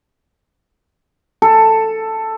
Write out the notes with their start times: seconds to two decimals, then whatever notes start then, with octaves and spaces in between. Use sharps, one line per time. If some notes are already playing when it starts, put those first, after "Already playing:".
1.42 A4